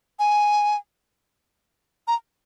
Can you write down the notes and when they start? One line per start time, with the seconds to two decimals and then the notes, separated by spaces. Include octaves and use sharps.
0.19 G#5
2.07 A#5